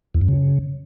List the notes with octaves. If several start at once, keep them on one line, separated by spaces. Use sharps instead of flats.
E2
F#2
C#3